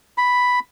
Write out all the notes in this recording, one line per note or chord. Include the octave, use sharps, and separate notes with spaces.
B5